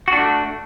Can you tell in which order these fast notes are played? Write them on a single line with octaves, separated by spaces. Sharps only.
F#4 D4 A3